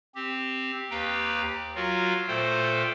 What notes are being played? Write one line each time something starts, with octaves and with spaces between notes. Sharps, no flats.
C4 G4
D#2 G4 B4 F5 G5 A#5
F#3 F4 F#4 A#4 F5
A#2 A3 A4 C5 G5